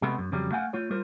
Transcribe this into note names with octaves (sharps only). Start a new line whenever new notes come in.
C3 G#3 A3 B3
F#2
F2 C#3 F#3 G3
A3 F5 F#5 G#5
A3 F4 C#5
G3 F4 A#4 C5